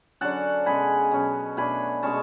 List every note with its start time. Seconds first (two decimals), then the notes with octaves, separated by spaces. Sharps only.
0.21 D3 F#3 C#4 F#5 A5
0.66 B2 G#3 C#4 G#5 B5
1.12 B2 F#3 C#4
1.57 B2 A3 D4 G#5 B5
2.03 B2 G#3 C#4 A5 C#6